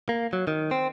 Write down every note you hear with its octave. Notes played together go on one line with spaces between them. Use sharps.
A#3
F#3
D#3
C4